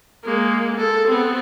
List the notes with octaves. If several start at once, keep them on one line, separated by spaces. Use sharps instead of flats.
G#3 A#3
A4
B3 C4